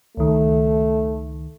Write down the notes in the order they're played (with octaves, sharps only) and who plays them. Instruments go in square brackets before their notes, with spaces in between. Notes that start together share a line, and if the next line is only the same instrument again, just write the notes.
[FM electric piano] C#2 D#3 [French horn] A3